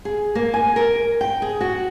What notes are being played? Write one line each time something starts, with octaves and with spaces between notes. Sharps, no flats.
G#4
A#3
G#5
A#4
G5
G#4
F#4